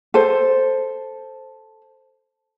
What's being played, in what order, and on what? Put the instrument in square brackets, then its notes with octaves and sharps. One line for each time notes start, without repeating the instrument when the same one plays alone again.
[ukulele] A4 C5